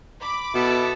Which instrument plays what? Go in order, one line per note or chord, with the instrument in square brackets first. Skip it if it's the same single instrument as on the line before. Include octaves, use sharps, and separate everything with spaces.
[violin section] B5 D6
[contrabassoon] B2 [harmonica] B3 E4 A4